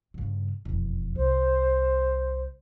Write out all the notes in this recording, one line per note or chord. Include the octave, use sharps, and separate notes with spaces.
G2 C#3
E1 F2
C2 C5